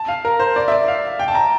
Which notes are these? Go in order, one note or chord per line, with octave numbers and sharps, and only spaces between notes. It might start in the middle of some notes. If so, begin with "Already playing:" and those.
Already playing: A5
F5
A#4
C5
D5
E5
D5
F5
G5
A5
A#5